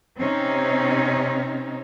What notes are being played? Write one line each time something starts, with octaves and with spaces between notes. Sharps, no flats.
C3 C4 C#4 D#4